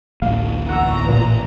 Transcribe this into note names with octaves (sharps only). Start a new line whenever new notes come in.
D1 A1 A#3 F5
E2 E3 F#5 A#5 C#6 E6
A1 A#2